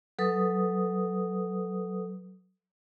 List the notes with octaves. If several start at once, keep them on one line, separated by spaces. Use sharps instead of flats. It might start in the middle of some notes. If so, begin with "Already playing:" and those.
F#3 A4 B4 D#6